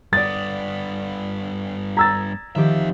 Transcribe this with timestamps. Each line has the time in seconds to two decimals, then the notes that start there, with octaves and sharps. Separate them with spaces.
0.13 G2 B3 D5 D#6 A6
1.97 A#5 E6 G#6 A6 B6
2.55 F2 D#3 F3 G4 E5